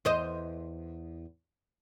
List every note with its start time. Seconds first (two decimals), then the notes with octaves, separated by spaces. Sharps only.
0.05 E2 C5 D#5